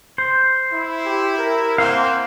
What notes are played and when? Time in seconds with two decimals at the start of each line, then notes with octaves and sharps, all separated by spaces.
0.18 C5
0.73 E4
1.05 G4
1.38 A#4
1.78 A#3 C4 C5 F5 F#5